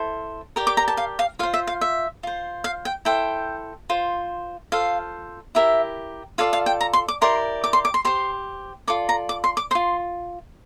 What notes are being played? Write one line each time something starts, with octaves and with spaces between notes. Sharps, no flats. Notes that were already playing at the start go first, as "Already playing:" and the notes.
Already playing: E4 A4 C5
G4 A#4 D5
D6
A#5
A5
F5
F5
F4 C5 F5
E5
F5
E5
F4 C5
F5
G5
E4 A4 C5 G5
F4 C5
F4 A4 C5 F5
E4 G4 A#4 E5
F4 A4 D5 F5
F5
G5
A#5
C6
D6
E4 G4 A#4 D5 C6
D6
C6
D6
C6
G4 C5 C6
F4 A4 D5 D6
A#5
D6
C6
D6
F4 C5 C6